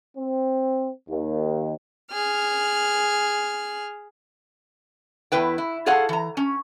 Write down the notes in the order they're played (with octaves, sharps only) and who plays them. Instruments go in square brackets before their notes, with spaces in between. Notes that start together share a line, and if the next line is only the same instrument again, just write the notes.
[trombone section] C4
D#2
[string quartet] G#4 F6
[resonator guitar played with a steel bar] E2 E4 B4 G5
E4
F4 G#4 A4 C#5 F5 F#5
E3 A#5
C#4